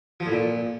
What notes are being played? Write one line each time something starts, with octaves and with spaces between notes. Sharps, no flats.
F3
A2
A#2